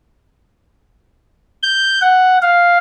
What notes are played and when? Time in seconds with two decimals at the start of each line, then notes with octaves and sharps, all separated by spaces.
1.63 G6
2.01 F#5
2.42 F5